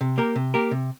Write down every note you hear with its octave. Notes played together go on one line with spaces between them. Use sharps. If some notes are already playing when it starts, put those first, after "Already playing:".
C3
A#3 G4 A#4
C3
A#3 G4 A#4
C3